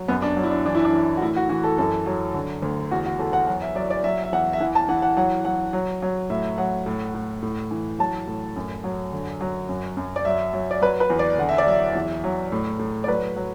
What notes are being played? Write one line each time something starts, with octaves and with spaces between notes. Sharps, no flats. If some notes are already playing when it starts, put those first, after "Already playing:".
Already playing: F#3
F#2 B3
D4
F#3
E4
D4
E3 D4
E4
D4
E3
F#4
A2 E4
F#4
E3 F#4
A4
F#2 A4
F#3
D3
D2
E2 F#4
F#4
E2 A4
F#5
F#3 F#5
E5
F#3 D5
D5
F#3 E5
E5
E2 F#5
E5
E3 F#5
A5
E3 F#5
F#5
F#3 F#5
F#3 F#5
F#3
F#3
A2 E5
F#3 F#5
A2
A2
A2
E3
F#3 A5
A2
F#2
F#3
D3
F#3
F#2
F#2
D5
F#3 E5
F#3
D5
F#3 B4
B4
E2
D5
D3 F#5
E5
D5
F#3 E5
E2
F#3
A2
A2
D5
F#3 B4
F#3